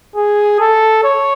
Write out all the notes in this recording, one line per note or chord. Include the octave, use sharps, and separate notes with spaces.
G#4
A4
C#5